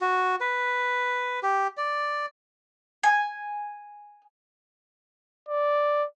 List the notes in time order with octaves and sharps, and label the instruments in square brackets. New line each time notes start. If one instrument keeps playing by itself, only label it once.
[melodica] F#4
B4
G4
D5
[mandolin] G#5
[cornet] D5